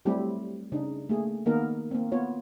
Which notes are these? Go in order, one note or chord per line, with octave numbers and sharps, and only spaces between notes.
F#3 G3 A3 C4 E4 G4
C#3 D4 D#4
A3 A#3 G#4
D#3 A#3 B3 D#4 A#4
A#3 C4
B3 F4 C#5